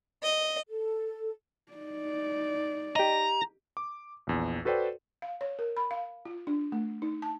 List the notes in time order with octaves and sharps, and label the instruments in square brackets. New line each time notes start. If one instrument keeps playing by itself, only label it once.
[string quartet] D#5
[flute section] A4
[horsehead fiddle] D#4 D5
[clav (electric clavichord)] G4 D#5 [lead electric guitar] A#5
[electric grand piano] D6
A#1 E2
F#4 A4 B4 C5 D5 G5
[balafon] F5
C#5
A#4
B5
F5
F4
D4
A3
D#4
A5